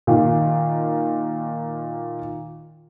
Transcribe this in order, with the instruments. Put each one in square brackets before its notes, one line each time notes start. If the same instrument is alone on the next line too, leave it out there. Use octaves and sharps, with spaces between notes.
[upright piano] A#2 D#3 F5